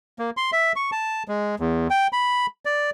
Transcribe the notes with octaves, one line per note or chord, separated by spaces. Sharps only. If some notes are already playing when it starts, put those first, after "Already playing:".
A#3
C6
E5
C#6
A5
G#3
E2
G5
B5
D5